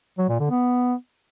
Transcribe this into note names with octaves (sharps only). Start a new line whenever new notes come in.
F#3
A#2
D3
B3